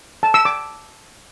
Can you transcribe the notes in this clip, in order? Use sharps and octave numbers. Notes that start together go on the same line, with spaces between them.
A5
E6
D6